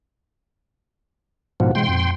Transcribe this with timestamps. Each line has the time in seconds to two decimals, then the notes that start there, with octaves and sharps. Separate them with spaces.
1.60 G#2 B2 F3 F5 F#5
1.75 B2 E3 G#3 G5 C6
1.88 F2 A#2